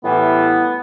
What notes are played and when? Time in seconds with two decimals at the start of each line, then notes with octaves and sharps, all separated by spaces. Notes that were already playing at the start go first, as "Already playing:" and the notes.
0.03 A2 E3 G3 B3